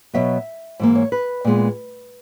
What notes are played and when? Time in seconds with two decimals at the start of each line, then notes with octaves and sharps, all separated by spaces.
0.14 B2 F#3 B3 E5
0.79 G#2 E3 A#3
0.95 C#5
1.12 B4
1.45 A#2 G#3 B3